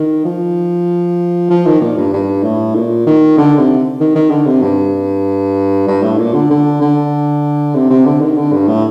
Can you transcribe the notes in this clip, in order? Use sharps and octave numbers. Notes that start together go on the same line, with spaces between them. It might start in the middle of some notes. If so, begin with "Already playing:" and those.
Already playing: D#3
F3
F3
D#3
A#2
G2
G2
A2
A#2
D#3
D3
C3
D#3
D#3
D3
C3
G2
G2
A2
A#2
D3
D3
D3
C3
C3
D3
D#3
D3
G2
A2